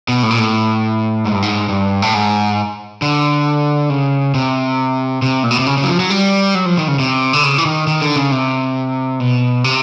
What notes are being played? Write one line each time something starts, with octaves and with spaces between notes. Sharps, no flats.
B2
A2
A#2
A2
G#2
G2
G#2
G2
A2
G#2
D3
C#3
C3
C3
A#2
B2
C3
C#3
C#3
F#3
F3
F#3
G3
F#3
F3
D#3
C#3
C3
D3
C#3
E3
D#3
D#3
D3
C#3
C3
B2
C3